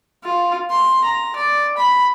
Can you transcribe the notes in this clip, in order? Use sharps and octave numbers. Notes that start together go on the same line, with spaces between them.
F4
C6
A#5
D5
B5